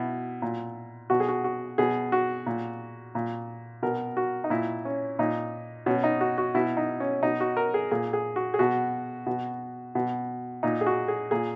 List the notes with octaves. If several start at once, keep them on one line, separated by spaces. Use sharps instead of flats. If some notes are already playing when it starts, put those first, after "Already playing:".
Already playing: B2 E4
A#2
B2 F#4
G#4
F#4
F#4
B2 G#4
F#4
A#2
A#2
B2 A#4
F#4
D#4
A#2 E4
C#4
A#2 D#4
B2 C#4
D#4
F#4
F#4
B2 E4
D#4
C#4
B2 D#4
F#4
A#4
G#4
A#2 G#4
G#4
F#4
G#4
B2 F#4
B2
B2
A#2 D#4
G#4
F#4
G#4
A#2 G#4